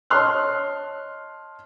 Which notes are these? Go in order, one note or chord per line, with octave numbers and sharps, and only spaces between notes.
C#5 D#5 A5 C6 F6 F#6